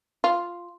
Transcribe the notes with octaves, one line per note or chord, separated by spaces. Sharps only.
F4